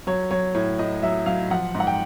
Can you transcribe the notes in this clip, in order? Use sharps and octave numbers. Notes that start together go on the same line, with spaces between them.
F#3 C#5
F#3 C#5
A2 C#5
A2 D#5
F#3 E5
F#3 F5
F3 F#5
G#2
F#5
G5